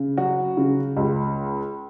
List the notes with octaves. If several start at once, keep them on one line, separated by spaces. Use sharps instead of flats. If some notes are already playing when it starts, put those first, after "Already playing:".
Already playing: C#3
F#3 F#4
C#3
C#2